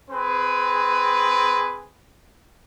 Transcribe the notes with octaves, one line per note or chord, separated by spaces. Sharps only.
C4 G#4 B4